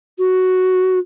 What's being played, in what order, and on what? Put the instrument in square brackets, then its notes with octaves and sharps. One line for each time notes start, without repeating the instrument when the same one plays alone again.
[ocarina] F#4